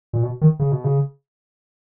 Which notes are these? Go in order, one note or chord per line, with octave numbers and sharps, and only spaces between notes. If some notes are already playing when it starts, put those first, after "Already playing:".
A#2
B2
D#3
C#3
B2
C#3